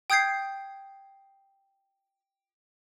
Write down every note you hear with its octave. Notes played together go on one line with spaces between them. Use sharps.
G5 D#6 G6 G#6 C7